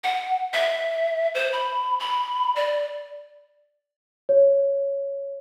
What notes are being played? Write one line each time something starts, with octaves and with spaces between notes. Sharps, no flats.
F#5
E5
C5
B5
B5
D5
C#5